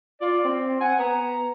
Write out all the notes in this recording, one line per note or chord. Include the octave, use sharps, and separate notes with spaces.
F4 D5
C4 G5
F#5 G#5
B3 A#5